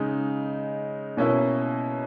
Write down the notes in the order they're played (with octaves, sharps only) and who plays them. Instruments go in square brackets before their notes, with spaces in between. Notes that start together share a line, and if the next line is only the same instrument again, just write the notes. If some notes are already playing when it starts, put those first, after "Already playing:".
Already playing: [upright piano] C#3 G#3 D#4
B2 A#3 C#4 E4